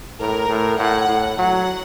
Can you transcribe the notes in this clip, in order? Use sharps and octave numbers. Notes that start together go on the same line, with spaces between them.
A2 A#4
A2
A2 F#5
A2
F#3 F#5